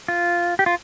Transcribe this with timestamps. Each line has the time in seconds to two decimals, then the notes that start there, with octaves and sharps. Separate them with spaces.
0.08 F4
0.59 G4
0.66 F4